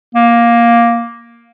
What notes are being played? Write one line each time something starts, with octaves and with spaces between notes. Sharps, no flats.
A#3